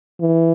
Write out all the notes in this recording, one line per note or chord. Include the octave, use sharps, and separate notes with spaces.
E3